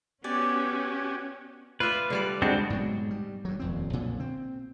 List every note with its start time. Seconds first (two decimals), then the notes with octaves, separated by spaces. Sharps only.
0.24 B3 C#4 F#4 G4 D5 G#5
1.80 F4 B4 D5 E5
2.10 D3 G3 D5
2.42 G#3 C4 D4 F#4
2.70 G#2 B2 F#3
3.11 G3
3.45 G2 F#3
3.60 D#1 F2 C4
3.93 B1 A#2 D3 F#3
4.20 C4